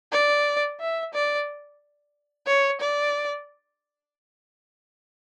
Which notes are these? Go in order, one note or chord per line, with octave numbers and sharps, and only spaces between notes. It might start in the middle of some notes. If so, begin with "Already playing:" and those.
D5
E5
D5
C#5
D5